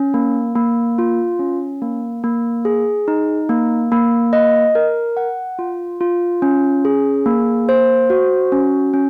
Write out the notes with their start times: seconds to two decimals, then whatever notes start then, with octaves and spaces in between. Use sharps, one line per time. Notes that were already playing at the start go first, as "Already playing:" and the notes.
Already playing: C#4
0.14 A#3
0.55 A#3
0.98 F4
1.39 C#4
1.82 A#3
2.24 A#3
2.65 G#4
3.08 D#4
3.49 A#3
3.92 A#3
4.33 D#5
4.75 A#4
5.17 F#5
5.59 F4
6.01 F4
6.42 C#4
6.85 G#4
7.26 A#3
7.69 C5
8.10 F#4
8.52 C#4
8.94 C#4